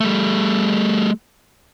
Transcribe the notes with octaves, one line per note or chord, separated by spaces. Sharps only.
G3 A3